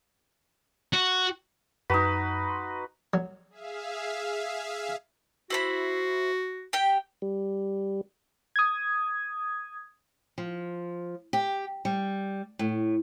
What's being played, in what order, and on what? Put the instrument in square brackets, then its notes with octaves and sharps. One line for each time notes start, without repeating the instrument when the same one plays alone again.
[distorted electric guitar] F#4
[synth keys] F#2 [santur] D#4 F#4 [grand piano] B4 [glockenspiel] A#5 B6
[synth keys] B5 C6
[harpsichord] F#3
[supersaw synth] G#4 E5 F5
[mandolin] E4 C5 B5 [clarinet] F#4
[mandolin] G4 G5
[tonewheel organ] G3
[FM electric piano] D#6 G#6
[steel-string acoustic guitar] F3
G4
G3
A2